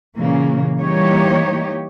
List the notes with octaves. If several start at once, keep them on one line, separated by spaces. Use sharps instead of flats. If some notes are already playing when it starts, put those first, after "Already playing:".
A#2 C#3 E3 A#3
E3 G3 A#3 D#4 G4 C#5